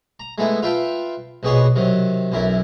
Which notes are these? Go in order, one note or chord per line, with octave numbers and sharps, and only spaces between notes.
A#5
G#3 A3 B3 E4
F4 B4 E5 F5 G5 A5
A#1 B2 B3 G#4 C#5 D#5
C3 D#3 F#3
B1 F#2 E4 A#4